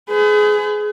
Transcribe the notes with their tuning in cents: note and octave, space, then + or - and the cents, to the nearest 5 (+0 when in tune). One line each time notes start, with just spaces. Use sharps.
G#4 +20 B4 +45